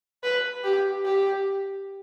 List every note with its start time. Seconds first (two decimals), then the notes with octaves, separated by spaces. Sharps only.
0.23 B4
0.64 G4
1.05 G4